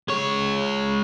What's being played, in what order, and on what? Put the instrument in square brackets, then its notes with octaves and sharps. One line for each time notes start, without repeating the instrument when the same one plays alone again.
[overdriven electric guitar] G#3 C#5